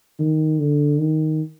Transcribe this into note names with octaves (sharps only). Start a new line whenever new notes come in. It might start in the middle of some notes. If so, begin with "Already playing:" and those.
D#3
D3
D#3